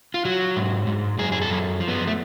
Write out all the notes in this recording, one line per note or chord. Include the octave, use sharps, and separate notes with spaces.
F4
F#3 F#4
G#2
G#2
F#2 G#4
G#4
A4
F#2
F3
B3
A3